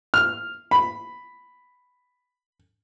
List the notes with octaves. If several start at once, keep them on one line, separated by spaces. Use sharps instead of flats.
F6
B5